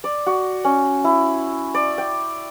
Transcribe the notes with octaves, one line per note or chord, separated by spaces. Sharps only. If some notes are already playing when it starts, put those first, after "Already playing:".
D5
F#4
C#4
E4
D5
G5